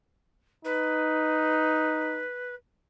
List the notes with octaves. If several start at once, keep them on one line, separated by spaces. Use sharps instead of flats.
D#4 B4